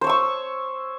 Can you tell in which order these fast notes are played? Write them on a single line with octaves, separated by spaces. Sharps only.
C5 C#5 E6 C#6